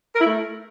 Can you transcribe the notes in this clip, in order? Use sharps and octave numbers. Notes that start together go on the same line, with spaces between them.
A#4
E4
A3